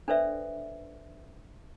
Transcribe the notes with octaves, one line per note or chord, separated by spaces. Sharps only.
D4 A4 B4 C5 D5 E5